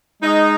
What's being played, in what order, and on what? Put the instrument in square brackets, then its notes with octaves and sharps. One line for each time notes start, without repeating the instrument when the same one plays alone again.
[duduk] G#3 [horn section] D#4